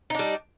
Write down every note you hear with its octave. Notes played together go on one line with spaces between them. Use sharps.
G3 D4 D#4